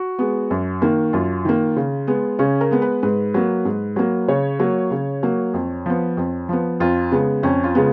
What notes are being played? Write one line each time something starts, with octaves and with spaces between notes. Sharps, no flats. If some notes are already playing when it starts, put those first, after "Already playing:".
Already playing: F#4
G#3 B3
F#2
D#3 A#3
F#2 F4
D#3 A#3
C#3
G#3 B3
C#3 C#4
A#4
G#3 B3
B4
G#2 B4
F#3 A#3
G#2
F#3 A#3
C#3 C#5
F#3 A#3
C#3
F#3 A#3
F2
F3 B3
F2
F3 B3
F2 F4
C#3 G#3 B3
F2 C#4
F4
C#3 G#3 B3